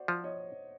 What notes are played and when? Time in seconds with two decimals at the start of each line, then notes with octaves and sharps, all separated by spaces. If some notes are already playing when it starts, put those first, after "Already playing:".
Already playing: F#4 C5 D5
0.08 F3
0.24 C#5 D#5